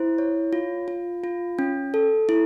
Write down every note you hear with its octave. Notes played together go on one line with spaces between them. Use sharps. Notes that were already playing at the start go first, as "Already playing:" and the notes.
Already playing: E4 C5
C#5
F4
F4
F4
C#4
A4
E4